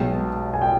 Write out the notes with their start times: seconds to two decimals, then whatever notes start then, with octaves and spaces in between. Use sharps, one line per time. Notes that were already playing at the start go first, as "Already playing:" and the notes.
Already playing: B1 B2 G#3 G5
0.54 G#5
0.62 G5